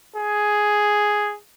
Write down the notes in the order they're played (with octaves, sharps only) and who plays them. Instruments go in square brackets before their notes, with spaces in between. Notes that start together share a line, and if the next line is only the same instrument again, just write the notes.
[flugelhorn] G#4